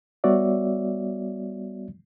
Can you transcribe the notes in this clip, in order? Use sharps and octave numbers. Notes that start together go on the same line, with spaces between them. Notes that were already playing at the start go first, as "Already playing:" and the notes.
G3 B3 F#4 C#5 D5 E5